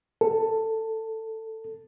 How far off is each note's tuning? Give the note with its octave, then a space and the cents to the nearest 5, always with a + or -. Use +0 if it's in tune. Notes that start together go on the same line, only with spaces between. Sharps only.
A4 +15